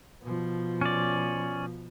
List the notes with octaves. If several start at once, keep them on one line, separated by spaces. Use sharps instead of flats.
B2 F3
C#4 D5